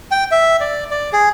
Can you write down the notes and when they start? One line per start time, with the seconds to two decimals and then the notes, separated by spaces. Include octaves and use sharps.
0.11 G5
0.31 E5
0.60 D5
0.91 D5
1.13 G#4